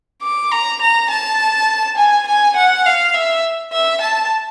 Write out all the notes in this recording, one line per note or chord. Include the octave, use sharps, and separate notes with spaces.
D6
A#5
A#5
A5
G#5
G#5
F#5
F5
E5
E5
A5